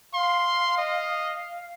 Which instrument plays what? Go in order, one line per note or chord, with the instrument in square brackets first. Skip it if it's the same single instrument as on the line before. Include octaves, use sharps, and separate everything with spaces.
[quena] F5 [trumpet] C6
[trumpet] D#5